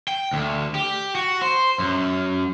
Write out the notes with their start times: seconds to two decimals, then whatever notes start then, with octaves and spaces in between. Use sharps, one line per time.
0.08 G5
0.33 D2
0.75 G4
1.15 F#4
1.42 C5
1.79 F#2